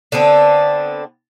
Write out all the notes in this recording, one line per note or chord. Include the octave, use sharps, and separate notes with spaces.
D3 B3 C4 D4